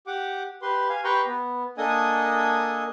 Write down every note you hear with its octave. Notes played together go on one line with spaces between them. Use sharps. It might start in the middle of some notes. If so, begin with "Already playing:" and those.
G4 F#5 D6
G4 B4 C6
F5 G#5
G4 B4 G5 A#5 C6 C#6
B3
A#3 D4 A4 D#5 G#5 D#6